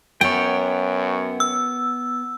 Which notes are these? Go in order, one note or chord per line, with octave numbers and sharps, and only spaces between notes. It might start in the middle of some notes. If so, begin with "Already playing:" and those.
F#2 B3 C#5 G5
E6